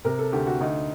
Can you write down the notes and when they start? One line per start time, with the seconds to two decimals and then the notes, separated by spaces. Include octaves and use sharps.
0.05 C3 A#4
0.19 A4
0.33 D2 G4
0.47 F#4
0.61 D2 D#4